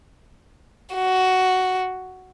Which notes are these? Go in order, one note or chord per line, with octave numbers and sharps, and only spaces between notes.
F#4